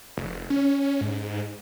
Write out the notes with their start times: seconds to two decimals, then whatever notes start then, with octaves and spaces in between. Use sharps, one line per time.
0.17 F1
0.50 C#4
1.01 G#2